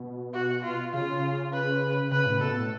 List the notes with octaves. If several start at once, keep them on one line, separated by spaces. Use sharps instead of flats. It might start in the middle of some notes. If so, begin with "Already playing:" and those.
Already playing: B2
F#4
F4
C#3 F4
B4
C#3 B4
A2
B2 A4
A2